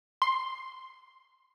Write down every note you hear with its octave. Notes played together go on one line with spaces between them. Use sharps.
C6